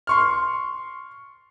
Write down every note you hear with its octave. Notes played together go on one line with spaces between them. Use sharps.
C6 C#6 F6